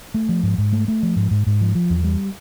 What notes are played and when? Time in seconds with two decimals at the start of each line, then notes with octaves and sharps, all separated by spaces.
0.14 A3
0.29 F3
0.43 G#2
0.58 G#2
0.72 A3
0.88 A3
1.03 F3
1.16 G#2
1.31 G#2
1.47 G#2
1.61 F3
1.75 F3
1.90 E2
2.04 G3